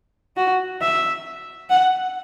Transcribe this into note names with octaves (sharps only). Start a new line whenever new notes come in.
F#4
E5
F#5